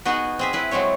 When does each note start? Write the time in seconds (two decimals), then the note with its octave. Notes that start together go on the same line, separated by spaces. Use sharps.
0.05 B3 D#4 F#4 G#4
0.39 C4 G#4 E5
0.53 C4 E4 B4
0.71 F#3 G#3 A3 C4 C#5